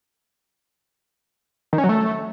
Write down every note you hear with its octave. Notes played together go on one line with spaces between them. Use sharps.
D#3
C#4
F#3
A3